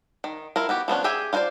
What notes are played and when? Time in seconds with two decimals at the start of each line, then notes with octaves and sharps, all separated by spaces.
0.24 D#3
0.56 E4 F4 A#4
0.69 B3 F#4 G4
0.88 F3 B3 C#4 D4
1.04 G4 G#4 E5 G5 G#5
1.33 F4 F#4 G#4 C5 D5